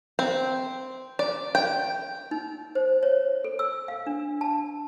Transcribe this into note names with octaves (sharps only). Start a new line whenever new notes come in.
C4
D5
G5
D#4
C5
C#5
A4
E6
F5
D4
A5